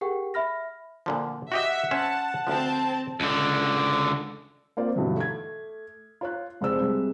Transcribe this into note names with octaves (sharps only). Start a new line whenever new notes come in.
G4 G#4 A#4 F#5 G5 C#6
E5 B5 F6 A#6
A#2 D3 F3
F#4 G4 D#5 E5 F#5
C#4 C5 E5 A5
D2 F3 C4 A5
C#2 D3
A#3 C4 F4 D5
B1 G2 B2 D3 E3
A3 G#6
F4 C#5 F#6
F1 F3 G#3 C4 D5 E6
C3 G3 G#3